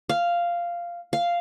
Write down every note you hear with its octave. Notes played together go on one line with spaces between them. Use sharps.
F5
F5